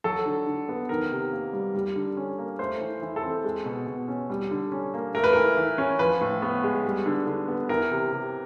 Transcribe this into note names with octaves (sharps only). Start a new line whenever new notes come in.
F#3 A4
D3
D3
B3
D#3 A#4
C3
A#3
G3
G3
D3
C#4
A#3
A3 C5
E3
E3
A4
C4
G#3
B2
B2
C#4
G3
D3
C#4
A#3
A3 A#4
B4
E3 A#4
E3
C#4
F3 B4
A2
B3
G#3
G3
D3
D3
B3
E3 A#4
C3
C3